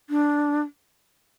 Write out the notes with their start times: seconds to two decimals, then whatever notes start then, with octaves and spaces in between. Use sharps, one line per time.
0.10 D4